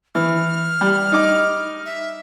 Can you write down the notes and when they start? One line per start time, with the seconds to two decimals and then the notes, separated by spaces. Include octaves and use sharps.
0.15 E3 F6
0.81 G3
1.12 D#4 D6
1.86 E5